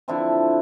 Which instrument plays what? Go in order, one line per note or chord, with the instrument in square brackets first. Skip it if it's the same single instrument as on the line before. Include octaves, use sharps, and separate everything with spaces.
[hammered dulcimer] D3 F3 C4 E4